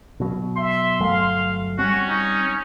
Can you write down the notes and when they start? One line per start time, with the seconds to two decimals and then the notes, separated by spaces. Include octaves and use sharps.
0.20 B2 F#3
0.57 E5 C6
1.00 G1 F#3 A3 F5
1.79 G3 C4 C#4 F#4
2.09 D#4